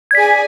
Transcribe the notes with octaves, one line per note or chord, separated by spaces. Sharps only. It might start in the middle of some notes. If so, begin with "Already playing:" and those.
G#6
G#4 D5 G#5 B6